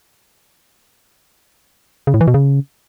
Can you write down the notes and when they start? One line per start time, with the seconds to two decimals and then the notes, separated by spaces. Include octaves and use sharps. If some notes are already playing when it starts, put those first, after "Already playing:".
2.07 C#3
2.14 A2
2.21 E3
2.27 B2
2.34 C#3